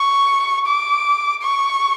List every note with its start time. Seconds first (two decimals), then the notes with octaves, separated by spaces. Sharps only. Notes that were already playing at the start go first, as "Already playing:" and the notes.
Already playing: C#6
0.66 D6
1.42 C#6